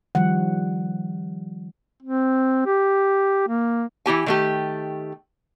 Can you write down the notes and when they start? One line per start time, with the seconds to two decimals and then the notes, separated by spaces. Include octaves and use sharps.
0.15 D#3 F3 G3 F#5
2.03 C4
2.66 G4
3.48 A#3
4.06 E3 E4 G4 G#5
4.26 D#3 A3 G4